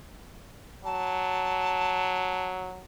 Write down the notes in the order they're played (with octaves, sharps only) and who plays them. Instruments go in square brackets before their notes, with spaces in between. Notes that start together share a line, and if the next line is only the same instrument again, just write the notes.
[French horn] F#3 [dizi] A5